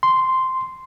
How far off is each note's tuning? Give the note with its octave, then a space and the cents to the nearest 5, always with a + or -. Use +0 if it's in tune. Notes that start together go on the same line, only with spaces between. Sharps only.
C6 -5